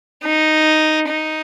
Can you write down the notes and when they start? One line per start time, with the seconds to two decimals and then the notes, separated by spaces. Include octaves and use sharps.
0.23 D#4
1.08 D#4